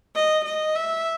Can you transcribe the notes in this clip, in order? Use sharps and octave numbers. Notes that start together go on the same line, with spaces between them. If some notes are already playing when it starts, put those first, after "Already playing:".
D#5
D#5
E5